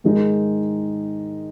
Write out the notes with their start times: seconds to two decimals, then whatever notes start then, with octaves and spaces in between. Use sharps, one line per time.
0.04 G#2 D#3 G#3 D#4 A#4